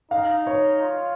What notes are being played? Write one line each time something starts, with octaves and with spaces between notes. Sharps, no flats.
D#4 F5
C#5
F4